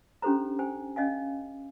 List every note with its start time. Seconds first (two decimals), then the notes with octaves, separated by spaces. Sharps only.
0.22 C#4 D4 G4 A4 C5 A#5
0.59 C5 G5 G#5
0.96 C#4 D#5 F5 G#5